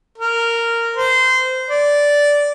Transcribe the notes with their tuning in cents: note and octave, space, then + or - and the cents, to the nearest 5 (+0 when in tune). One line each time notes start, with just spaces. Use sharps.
A#4 -10
C5 -20
D5 -10